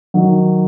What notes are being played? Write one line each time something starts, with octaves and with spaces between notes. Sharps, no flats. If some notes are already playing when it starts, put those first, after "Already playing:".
D#3 F#3